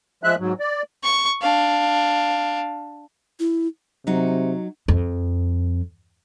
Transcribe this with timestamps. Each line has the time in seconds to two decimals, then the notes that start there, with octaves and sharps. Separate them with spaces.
0.24 F3 G#3 E5 F#6
0.39 G#2 F#3
0.59 D5
1.03 C#6
1.41 D4 F5
3.40 E4
4.07 C3 F#3 D#4 F#4
4.88 F2